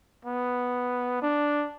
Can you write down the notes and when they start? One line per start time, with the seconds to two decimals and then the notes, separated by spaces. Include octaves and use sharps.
0.25 B3
1.22 D4